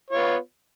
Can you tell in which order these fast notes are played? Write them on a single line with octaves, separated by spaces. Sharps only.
C#5 F4 B3